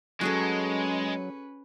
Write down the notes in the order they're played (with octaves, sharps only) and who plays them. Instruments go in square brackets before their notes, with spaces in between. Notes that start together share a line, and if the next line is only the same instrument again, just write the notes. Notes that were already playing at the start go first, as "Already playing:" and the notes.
[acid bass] F#3 [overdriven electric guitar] G#3 [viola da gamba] C#4 B4 [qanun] F#4 G#4 A4